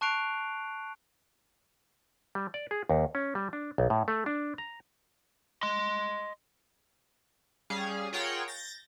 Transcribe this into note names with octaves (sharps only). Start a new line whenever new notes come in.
A5 C#6 F#6 C7 D7 F7
G3
D5
G#4
D#2
C#4
G3
D4
B1
A2
A3
D4
A#5
D#5 C6
G3 C#4 G#4 F5
F4 G#4 A#4 C#5 F#5 G5
G6 A6 A#6